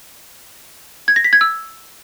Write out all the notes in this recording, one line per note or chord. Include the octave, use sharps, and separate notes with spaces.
G#6
A#6
B6
G#6
E6